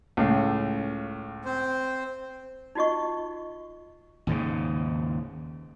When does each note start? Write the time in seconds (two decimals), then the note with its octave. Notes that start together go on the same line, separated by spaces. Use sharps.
0.17 C#2 A2 F5
1.45 C4 C5
2.75 D#4 F4 F#4 D#5 C#6
4.27 D#2 G#2 C#3